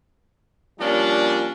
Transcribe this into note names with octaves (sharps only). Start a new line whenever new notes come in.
F3 G3 A#3 C#4 D4